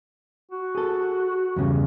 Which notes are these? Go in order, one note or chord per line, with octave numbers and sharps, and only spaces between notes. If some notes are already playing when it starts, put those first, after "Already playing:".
F#4
G#4 A4
E2 G2 C#3